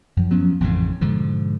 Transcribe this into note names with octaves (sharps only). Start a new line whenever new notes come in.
F#2 F3
F3 F#3 B3 C#4
A1 F2 G#2 C#3
G#2 B2 D3 F3